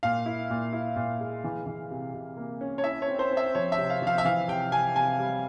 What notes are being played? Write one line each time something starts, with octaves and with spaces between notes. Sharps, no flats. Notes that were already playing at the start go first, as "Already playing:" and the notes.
A#2 F5
E4
A#2
E4
A#2
G#3
E3
E3
C3
C3
A#3
C#4
C#5
E4 E5
C#5
C4
C5
C4
E5
F3 C#5
E5
C3
F5
F3 F5
E5
E3 F5
C3 G5
C3 G#5
C3 G#5
G3